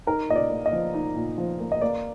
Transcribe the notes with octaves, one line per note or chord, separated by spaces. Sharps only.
D#4 A#4
A#2 D#5
D5
A#3
D#5
F3
D#4
A#2
F3
A#3
D#5
A#3 D5